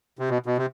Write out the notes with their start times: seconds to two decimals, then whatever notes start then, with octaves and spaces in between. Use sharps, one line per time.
0.19 C3
0.30 B2
0.46 B2
0.58 C3